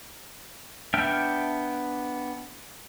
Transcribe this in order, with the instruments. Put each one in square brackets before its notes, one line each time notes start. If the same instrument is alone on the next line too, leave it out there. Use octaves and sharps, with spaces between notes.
[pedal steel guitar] B3 D4 E5 G5 F6